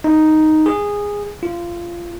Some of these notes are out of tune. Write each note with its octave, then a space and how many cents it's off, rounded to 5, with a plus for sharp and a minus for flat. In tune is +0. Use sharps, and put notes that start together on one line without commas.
D#4 +0
G#4 -15
F4 -20